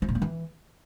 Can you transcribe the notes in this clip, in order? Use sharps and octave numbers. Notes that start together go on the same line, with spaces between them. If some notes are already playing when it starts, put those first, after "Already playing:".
F3
A#2
A#3
E3